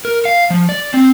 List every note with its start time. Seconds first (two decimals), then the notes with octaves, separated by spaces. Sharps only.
0.05 A#4
0.25 F5
0.50 F3
0.69 D5
0.94 C4